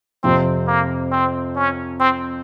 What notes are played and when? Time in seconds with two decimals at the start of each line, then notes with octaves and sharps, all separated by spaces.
0.23 F2 C3 F3 C4
0.67 A#3
1.12 C4
1.56 C#4
2.00 C4